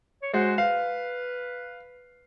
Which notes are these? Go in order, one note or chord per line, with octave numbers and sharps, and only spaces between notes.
C#5
G#3 F#4 C5
B4 F5